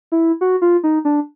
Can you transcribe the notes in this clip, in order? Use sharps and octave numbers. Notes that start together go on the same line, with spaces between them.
E4
F#4
F4
D#4
D4